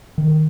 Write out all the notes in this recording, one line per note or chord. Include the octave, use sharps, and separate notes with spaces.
D#3